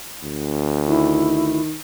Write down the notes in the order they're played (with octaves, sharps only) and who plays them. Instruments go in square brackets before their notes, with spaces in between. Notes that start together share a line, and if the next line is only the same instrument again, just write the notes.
[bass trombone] D2
[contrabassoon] D#3 [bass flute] E4